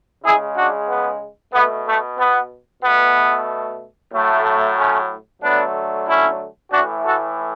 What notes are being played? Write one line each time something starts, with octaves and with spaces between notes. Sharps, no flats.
C#3 G#3 E4 G#4
D4 F#4
B3
B2 A3 B3
A3
B3
B2 A3 B3
A2 F#3 A3
A3 C#4
D3 F#3 A3 B3 D4
C#4 E4
A2 E3 A3 D4 F#4
F#4 A4